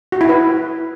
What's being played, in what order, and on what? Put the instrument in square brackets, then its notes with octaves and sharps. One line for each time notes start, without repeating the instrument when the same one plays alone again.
[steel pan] F#4
E4
B4